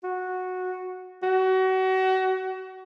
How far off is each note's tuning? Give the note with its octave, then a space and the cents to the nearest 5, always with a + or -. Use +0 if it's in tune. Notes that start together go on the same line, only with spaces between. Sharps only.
F#4 -10
F#4 +30